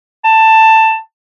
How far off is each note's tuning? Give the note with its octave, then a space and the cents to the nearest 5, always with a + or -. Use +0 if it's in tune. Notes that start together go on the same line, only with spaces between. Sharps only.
A5 +15